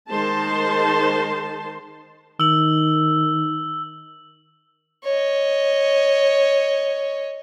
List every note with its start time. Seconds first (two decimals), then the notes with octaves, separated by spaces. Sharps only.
0.11 D#3 G#3 C5 A5 C6
2.40 D#3 E6 F#7
5.04 C#5 D#5